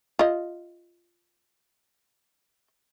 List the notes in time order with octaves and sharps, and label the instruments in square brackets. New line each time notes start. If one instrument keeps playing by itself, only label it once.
[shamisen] F4 D#5